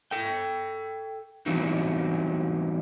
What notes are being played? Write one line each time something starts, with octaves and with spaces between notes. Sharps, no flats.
A4 G5
E3 F#3 G3 B3 C4 D#4